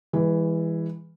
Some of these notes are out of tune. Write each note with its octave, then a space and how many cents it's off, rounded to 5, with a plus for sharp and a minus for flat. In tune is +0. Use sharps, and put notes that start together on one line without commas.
E3 +0 G#3 -35